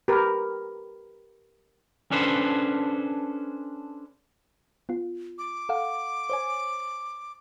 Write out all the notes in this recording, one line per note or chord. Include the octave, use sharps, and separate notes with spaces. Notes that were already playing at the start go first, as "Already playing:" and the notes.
G4 A#4 B4
C#4 D4 A4 B4 C5
B3 F4
D6
A4 F5 F#5
C5 C#5 G#5